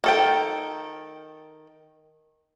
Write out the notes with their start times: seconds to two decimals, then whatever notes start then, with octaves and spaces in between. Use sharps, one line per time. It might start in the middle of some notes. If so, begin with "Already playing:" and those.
0.04 D#3 A4 G5